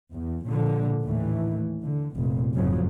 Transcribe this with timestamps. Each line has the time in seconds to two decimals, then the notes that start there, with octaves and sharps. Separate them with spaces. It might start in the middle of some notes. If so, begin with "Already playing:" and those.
0.12 E2
0.46 A#2 D3 F3
1.03 D#2 A2 E3 A3
1.81 D3
2.14 F1 A#2
2.52 F#1 F2 G#2 C#3 F3 F#3